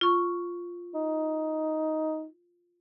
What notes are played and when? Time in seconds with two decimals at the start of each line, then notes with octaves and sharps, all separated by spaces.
0.01 F4 C#6
0.95 D#4